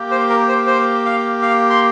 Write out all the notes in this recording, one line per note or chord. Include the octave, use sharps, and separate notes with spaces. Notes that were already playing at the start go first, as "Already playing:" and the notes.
Already playing: A#3 G4
C5
A#4
C5
C5
F5
F5
C6